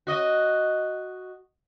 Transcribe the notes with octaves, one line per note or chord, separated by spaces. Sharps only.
F#4 D#5